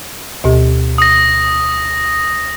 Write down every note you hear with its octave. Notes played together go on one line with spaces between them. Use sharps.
D2 B2 G4
D#6 A#6